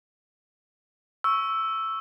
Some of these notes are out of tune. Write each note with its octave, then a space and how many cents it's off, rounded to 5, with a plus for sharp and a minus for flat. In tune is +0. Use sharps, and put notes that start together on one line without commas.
C#6 +0 E6 +0